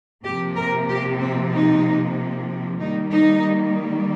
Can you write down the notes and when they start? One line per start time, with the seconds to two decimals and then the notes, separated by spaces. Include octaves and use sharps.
0.23 C3 F3 A#3 G4
0.55 A#4
0.88 G4
1.20 C4
1.52 D#4
2.79 D#3 G3 A#3 D#4
3.11 D#4